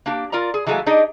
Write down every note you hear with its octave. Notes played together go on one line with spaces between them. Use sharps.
A#3 D4 G4
F4 A#4 D5 A#5
G#4
E3 F#3 G#3 A3 F5 G#5
D4 D#4 G4 G#4 D#5